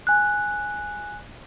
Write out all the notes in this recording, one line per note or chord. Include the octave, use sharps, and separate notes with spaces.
G#5 F#6